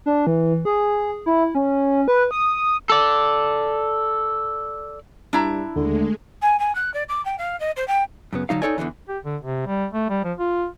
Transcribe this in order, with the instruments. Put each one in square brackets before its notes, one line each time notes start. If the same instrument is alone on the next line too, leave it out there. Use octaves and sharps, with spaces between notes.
[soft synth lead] D4
E3
G#4
E4
C#4
B4
D#6
[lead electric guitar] A4 D5
[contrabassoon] G2 [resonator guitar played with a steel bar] D4 E4 A#5
[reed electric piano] D#2 [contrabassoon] D3 [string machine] G#3 A3
[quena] G#5
G#5
F#6
D5
D6
G5
F5
D#5
C5
G5
[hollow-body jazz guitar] F#2 C#3 B3
D3 F#3 D#4 F5
D#4 E4 A4 C#5 D5 G#5
E2 G#2 D3 E3
[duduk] G4
D3
C3
G3
A3
G3
F3
F4